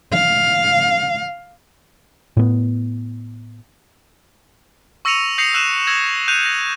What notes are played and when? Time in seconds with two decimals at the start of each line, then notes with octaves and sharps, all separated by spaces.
0.13 F5
2.37 A2 B3
5.05 C#6 E6 A#6 C#7 D#7 F7
5.38 D#6 G6 A#6 C7 C#7 F7
5.54 E6 F#6 A#6 D#7 E7
5.87 D#6 E6 G#6 A#6
6.28 F#6 G6 D#7 F7
6.46 A#6